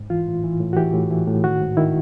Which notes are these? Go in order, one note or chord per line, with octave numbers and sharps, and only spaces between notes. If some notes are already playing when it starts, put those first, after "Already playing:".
Already playing: G#2
E3 F4
A2
E3
A2
F#4
E3 G4
A2
E3
A2
D#3 F#4
G#2
D#3 E4